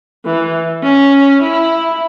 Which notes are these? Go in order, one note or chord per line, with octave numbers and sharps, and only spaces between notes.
E3
C#4
E4